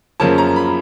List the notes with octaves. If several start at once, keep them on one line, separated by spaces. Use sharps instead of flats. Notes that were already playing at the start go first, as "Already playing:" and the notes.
F#2 C#3 F3 A#3 C#4 A5
A#5
B5